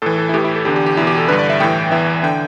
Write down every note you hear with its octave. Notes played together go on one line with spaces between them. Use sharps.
A2 E3 A4
A4
E4
A2 E3 G4
E4
A4
E2 D3 G4
G4
G4
E2 B2 E4
G4
A4
G2 D3 B4
D5
E5
A2 E3 G5
E2 E3 E5
D3 G5